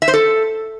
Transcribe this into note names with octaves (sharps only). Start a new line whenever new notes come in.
E5
C5
A4